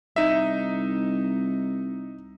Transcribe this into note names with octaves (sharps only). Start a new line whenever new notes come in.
C2 D#4 E5